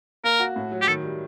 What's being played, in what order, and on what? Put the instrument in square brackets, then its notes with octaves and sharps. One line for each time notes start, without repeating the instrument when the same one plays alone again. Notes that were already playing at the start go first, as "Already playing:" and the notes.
[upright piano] A#3 [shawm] A#4
[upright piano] F#4
A2
F#3
[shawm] G4
[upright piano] D#3 [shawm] A4
[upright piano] G3